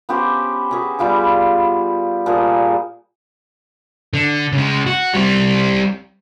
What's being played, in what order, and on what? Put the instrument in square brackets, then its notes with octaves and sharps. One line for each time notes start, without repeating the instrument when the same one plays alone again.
[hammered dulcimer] B3 C#4 G4 C5
C#4 F#4 G#4 B4
G3 B3 F4 D6
A#2 F3 G3 G#4
[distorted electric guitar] D3
C#3 G#3
F#4
G3 C4